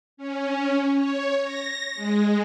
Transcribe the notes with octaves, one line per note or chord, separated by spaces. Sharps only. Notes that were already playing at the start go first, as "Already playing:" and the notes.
C#4
C#5
A#6
G#3